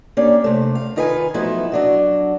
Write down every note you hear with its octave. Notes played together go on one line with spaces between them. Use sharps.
A#3 C#4 D4 G4
C3 A3
F5
D#3 D#4 F4 B4 D#5 G#5
F3 F#3 A3 B3 D#4 E4
F#3 D4 F#4